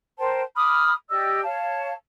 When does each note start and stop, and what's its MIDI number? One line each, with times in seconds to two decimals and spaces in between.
0.18 0.41 70
0.18 0.41 72
0.18 0.41 79
0.18 0.41 81
0.56 0.92 83
0.56 0.92 86
0.56 0.92 87
0.56 0.92 89
1.09 1.41 67
1.09 1.41 74
1.09 1.41 75
1.09 1.41 88
1.43 1.92 73
1.43 1.92 77
1.43 1.92 81